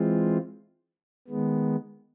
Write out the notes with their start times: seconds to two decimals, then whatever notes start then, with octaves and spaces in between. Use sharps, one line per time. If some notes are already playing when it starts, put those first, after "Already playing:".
Already playing: E3 G#3 C4 F4
1.28 D#3 G#3 B3